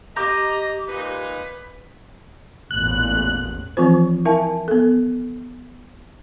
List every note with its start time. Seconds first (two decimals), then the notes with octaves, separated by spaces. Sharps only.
0.17 G4 D#5 A#5 D6 G6
0.89 A#2 G#3 D#4 B4
2.71 A1 E2 A#2 F#6
3.77 E3 F3 C4 F4 C5
4.25 E4 A#4 E5 G#5 A5
4.68 B3 A4